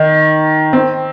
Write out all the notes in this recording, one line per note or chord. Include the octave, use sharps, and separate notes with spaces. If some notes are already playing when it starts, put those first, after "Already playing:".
Already playing: D#3
C4